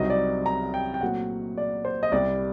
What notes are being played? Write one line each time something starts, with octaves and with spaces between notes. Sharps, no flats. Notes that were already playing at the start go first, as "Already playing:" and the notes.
Already playing: C2 C3 F#3 C4 D#4 D#5
D5
A#5
G5
G5
A#2 F#3 A3 C4 F#5
D5
C5
D#5
C2 C3 G3 D5